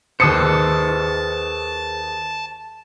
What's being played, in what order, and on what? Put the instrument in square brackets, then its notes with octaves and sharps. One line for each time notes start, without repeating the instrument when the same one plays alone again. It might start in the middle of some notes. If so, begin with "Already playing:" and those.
[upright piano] D#2 D#6 C#7 [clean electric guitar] G#4 B4 C5 [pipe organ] A5